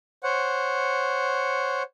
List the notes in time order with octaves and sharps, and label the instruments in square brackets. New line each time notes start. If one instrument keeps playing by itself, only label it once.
[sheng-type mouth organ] C5 C#5 F#5